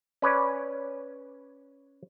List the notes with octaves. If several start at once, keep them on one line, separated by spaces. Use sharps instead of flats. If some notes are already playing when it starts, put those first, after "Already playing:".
C#4 B4 C#5 D5